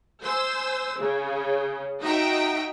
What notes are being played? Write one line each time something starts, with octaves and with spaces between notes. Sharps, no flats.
C5 G#5 E6
C#3
D#4 F#4 D#5 E5 G5